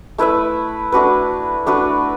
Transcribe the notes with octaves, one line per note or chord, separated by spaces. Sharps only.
A3 E4 B4 E5
A3 D4 F#4 B4
A3 D4 F#4 B4